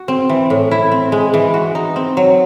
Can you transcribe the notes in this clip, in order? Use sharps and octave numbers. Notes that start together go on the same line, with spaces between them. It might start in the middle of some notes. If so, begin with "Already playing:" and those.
Already playing: F#4
C4
E3
A2
E4
C4
G#3
E3
F#4
D#4
C4
F#3